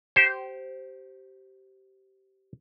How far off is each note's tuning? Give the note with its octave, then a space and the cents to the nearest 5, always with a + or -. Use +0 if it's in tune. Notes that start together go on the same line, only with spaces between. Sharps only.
G4 -25 C5 +0